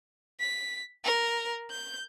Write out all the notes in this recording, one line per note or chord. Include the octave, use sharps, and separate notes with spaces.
B6
A#4
G6